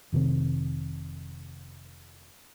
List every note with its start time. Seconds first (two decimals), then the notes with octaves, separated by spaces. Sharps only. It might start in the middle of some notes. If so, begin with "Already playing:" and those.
0.12 F1 C3 D#3 C4